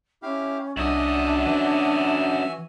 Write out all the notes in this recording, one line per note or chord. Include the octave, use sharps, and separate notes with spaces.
C#4 E4 G4 F5
C2 F#2 D4 F#4 D#5 E5 G#5
E3